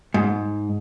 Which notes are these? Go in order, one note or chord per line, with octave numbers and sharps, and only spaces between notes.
G#2